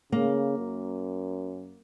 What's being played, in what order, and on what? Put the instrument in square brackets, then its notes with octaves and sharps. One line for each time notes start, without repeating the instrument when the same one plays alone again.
[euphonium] C#3 [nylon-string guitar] A#3
[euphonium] F#2